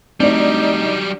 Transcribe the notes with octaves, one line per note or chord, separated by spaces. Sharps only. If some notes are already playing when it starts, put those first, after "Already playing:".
F#3 G3 A3 C4 D4 D#4 D5